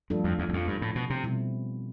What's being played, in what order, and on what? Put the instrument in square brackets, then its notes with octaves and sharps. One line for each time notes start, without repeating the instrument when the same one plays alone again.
[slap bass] G2 [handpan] F3 A3 D4 F4 A4
[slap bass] F2
E2
E2
F2
G2
A2
B2
C3
[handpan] B2 G3 C4 E4